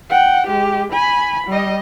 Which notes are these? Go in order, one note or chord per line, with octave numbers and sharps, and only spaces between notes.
F#5 G5
G#3 G4
G#5 B5
G3 D#5